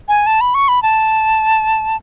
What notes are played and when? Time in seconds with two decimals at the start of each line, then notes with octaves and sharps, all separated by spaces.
0.08 G#5
0.27 A5
0.41 B5
0.54 C#6
0.68 B5
0.83 A5